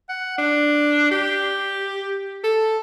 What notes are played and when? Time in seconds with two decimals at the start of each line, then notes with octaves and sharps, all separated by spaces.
0.09 F#5
0.38 D4
1.11 G4
2.44 A4